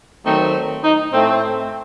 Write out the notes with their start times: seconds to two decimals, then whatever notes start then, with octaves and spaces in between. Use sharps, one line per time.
0.24 D#3 F#3 A3 C4 D#4
0.82 D#4
1.11 A2 A3 C4